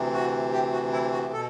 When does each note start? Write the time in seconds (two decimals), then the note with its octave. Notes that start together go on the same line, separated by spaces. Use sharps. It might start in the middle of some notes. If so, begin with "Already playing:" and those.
Already playing: D2 C3 E3
0.13 F#4
0.53 G4
0.72 F#4
0.92 E4
1.12 F#4
1.33 B2 A4